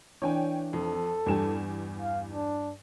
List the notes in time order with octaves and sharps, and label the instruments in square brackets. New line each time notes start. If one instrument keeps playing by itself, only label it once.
[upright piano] E3 D4 [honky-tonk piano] C#5 G5 G#5
[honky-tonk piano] F2 [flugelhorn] A4
[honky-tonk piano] E2 G3 G#5 [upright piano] G2 E7
[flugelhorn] F5
D4